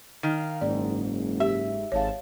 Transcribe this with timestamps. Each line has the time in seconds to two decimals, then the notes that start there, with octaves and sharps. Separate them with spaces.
0.23 D#3 F5 F6
0.61 F#1 G#2 D5
1.40 G4 E5
1.92 G#1 G#2 C#5 F5 A5